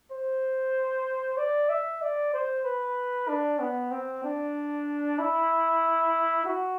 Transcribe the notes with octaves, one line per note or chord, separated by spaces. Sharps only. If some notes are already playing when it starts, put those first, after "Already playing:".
C5
D5
E5
D5
C5
B4
D4
B3
C4
D4
E4
F#4